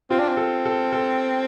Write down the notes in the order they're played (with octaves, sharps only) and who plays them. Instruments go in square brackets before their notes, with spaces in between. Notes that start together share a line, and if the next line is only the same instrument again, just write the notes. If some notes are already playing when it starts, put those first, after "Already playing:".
[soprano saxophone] C4 [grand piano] F4
[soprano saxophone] D4
C4
[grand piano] A4
A4
A4